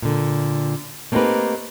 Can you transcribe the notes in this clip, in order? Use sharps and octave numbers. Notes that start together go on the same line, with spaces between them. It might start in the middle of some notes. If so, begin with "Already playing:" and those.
A#2 D3
A3 A#3 C4 D#4 G4 B4